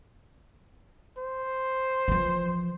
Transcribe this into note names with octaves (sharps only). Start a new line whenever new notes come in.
C5
E3 F3